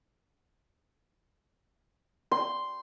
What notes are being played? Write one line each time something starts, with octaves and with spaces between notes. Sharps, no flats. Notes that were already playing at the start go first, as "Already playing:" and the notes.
C6